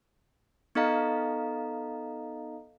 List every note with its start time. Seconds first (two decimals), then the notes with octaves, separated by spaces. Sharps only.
0.75 B3 D#4 A4 D#5 F5 A#5